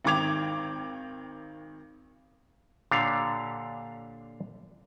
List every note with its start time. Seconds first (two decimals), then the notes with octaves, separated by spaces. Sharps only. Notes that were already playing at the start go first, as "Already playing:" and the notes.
0.05 G#1 D#3 G5 D6 G#6 F7
2.91 A#2 D3 D4 G4 C#5 F5